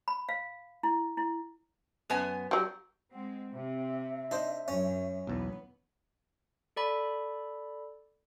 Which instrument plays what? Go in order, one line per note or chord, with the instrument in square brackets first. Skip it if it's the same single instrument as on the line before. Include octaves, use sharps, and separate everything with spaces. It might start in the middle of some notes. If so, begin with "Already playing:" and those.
[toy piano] B5
F5
E4
E4
[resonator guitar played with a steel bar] F#2 B3 G#5
[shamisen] F#3 G3
[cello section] G#3 C4 [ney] F#5
[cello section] C3 C4 [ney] E5
[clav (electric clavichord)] D4 C5 [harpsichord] D#4
[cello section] F#2 [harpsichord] C#4
[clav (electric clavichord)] B1 E2 [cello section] B3
[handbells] A4 D5 B5